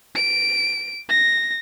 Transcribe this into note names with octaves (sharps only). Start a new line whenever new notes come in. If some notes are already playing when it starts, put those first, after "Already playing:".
D7
A#6